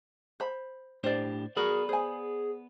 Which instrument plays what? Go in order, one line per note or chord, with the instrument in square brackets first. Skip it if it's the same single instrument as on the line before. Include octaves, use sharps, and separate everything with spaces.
[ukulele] C5 B5
[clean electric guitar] A2 D4 G4 [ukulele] C5 D5
[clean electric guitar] B3 D5 B5 [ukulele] F#4 A#4 [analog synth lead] G#4
[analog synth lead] G#4 [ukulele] C5 G#5